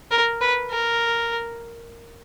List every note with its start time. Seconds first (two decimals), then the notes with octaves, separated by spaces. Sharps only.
0.11 A#4
0.41 B4
0.71 A#4